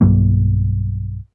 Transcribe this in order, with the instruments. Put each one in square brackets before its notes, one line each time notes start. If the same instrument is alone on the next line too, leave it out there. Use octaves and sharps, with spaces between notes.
[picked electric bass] B1 G2 F#3 A#3